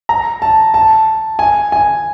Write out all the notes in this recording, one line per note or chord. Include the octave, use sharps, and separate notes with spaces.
A#5
A5
A5
G#5
G#5